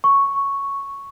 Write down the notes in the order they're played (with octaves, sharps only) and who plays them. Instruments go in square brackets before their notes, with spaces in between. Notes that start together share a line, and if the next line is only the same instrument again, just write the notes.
[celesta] C#6